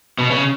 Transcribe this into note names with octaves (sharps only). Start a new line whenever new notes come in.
B2
C#3